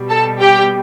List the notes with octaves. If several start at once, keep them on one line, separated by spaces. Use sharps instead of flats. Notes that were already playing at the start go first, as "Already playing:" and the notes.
Already playing: B2 G3
A4 A5
G4 G5